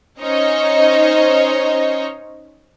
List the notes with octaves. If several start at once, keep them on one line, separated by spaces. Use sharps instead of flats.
C#4 D#4 C5 C#5 D#5 A#5